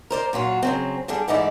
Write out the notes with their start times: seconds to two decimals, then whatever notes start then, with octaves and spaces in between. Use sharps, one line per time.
0.10 A#4 C5 D5
0.33 A#2 F#3 F4 F#4
0.63 C#3 F#3 C4
1.08 D3 G3 D4 G#4
1.28 D2 G#2 E3 D#4 D5 E5